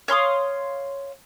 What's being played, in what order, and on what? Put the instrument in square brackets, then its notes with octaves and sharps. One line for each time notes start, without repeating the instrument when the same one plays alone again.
[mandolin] C#5 F5 C6 D#6